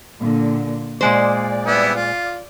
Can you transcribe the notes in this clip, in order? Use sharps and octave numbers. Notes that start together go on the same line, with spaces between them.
A#2 D3
A#2 G#3 C5 D5
G3 B3 E4
F4